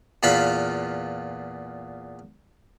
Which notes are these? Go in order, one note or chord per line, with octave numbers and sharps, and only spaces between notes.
E2 A#2 F4 B4 F5 B5